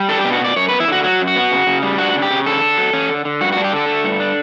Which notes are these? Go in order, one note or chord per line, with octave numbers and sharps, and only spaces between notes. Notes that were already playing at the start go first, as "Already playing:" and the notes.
Already playing: G3
D4 A4
G4
B2
F#4
B2 D5
F#2 C#5
B4
B3
E4
D3 F#4
F#3 F#4
F#2
F#4
B3
C#3
C#3
G3
D4 F#4
C#3
G4
C#3
D3 A4
D3
F#3
C#4
D3
D3
G2 F#4
F#4
D4
G4
D3 A4
A3
G2
D4